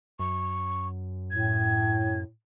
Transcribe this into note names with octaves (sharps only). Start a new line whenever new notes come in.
F#2 C#6
A2 G#6